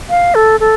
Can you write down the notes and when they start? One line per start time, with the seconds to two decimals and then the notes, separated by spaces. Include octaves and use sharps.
0.10 F5
0.35 A4
0.60 A4